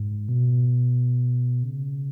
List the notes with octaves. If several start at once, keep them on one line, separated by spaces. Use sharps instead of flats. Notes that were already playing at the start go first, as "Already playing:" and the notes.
Already playing: G#2
B2
C#3